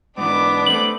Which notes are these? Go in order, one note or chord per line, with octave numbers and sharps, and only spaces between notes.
G#2 E3 B3 D4 D6
A3 C4 F#7